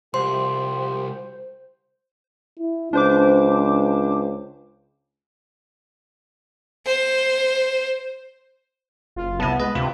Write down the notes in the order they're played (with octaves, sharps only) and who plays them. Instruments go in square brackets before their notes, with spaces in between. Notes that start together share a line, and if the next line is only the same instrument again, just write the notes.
[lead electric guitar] C2 [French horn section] F3 F#4 G4 [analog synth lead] C5 [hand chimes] C6
[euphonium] E4
[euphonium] C#2 [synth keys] D4 C5 D6
[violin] C5
[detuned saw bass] F#1 [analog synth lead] F4
[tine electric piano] C2 E4 [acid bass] B3 [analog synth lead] A5
[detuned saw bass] G#3 [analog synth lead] B4 [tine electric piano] D#5
[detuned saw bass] D2 [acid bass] C3 [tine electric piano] F4